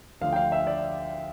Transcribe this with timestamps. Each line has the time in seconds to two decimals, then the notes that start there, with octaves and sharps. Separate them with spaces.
0.21 D2 D3 F3 F5
0.33 G5
0.36 F5
0.52 E5
0.67 D5